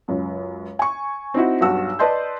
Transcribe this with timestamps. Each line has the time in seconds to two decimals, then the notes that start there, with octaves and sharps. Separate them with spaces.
0.08 C#2 F#2
0.79 G#5 C#6
1.34 C4 D#4 E4 F#4
1.61 B1 G2 F#4 E6
1.99 B4 D5 D#5 A5 C6 G6